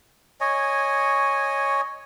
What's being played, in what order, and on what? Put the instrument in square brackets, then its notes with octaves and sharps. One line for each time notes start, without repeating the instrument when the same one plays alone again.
[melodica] C#5 D#5 G#5